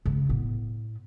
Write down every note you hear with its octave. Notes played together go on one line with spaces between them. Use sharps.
C#3 G#3
A2 B3